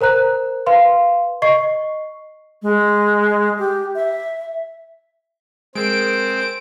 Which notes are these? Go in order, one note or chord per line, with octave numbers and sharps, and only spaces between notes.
A#4 C5 A#5 F#6
B4 F5 C6
D#5 C#6 C7
G#3
G4
E5
G#3 C4 A#4 D7